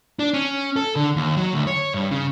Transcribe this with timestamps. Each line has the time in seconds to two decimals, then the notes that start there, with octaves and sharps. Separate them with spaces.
0.19 D4
0.34 C#4
0.76 A4
0.96 D3
1.16 D#2
1.37 F#3
1.53 D2
1.67 C#5
1.94 G2
2.11 C#3